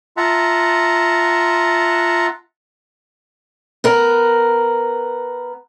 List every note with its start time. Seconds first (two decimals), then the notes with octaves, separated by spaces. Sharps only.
0.17 F4 E5 F#5 A5 A#5
3.84 B3 A#4